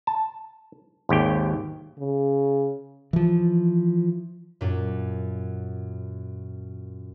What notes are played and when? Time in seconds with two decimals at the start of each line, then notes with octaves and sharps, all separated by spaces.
0.07 A5
1.09 G#1 D#2 G4 G5
1.99 C#3
3.13 E3 F3
4.61 F#2 A#2